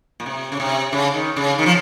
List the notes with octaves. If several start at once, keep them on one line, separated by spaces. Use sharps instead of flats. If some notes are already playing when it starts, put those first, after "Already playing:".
A#2
C3
C#3
C3
C#3
D#3
C#3
D#3
F3